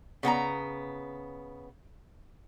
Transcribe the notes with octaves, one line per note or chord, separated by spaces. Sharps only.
C#3 B3 D#4 A#5